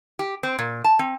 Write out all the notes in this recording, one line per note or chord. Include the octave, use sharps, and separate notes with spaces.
G4
C4
A#2
A5
C4